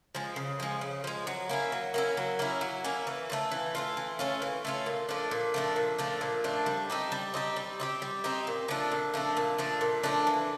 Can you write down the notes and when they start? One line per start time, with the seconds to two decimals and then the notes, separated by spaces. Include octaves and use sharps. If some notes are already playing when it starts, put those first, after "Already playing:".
0.15 F3 G#3
0.36 C#3
0.60 F3 G#3
0.81 C#3
1.04 F3 G#3
1.27 F#3
1.49 A#3 C#4 E4
1.72 F#3
1.94 A#3 C#4 E4
2.17 F#3
2.39 A#3 C#4 E4
2.61 F#3
2.84 A#3 C#4 E4
3.07 E3
3.30 A3 C#4 F4
3.52 E3
3.75 A3 C#4 F4
3.97 E3
4.19 A3 C#4 F4
4.42 E3
4.65 A3 C#4 F4
4.86 A#2
5.09 F3 A3 D4
5.31 A#2
5.54 F3 A3 D4
5.76 A#2
5.98 F3 A3 D4
6.21 A#2
6.44 F3 A3 D4
6.66 G3
6.90 C4 D#4 G4
7.12 G3
7.34 C4 D#4 G4
7.56 G3
7.80 C4 D#4 G4
8.02 G3
8.24 C4 D#4 G4
8.47 A#2
8.68 F3 A3 D4
8.92 A#2
9.14 F3 A3 D4
9.37 A#2
9.58 F3 A3 D4
9.81 A#2
10.03 F3 A3 D4
10.27 E3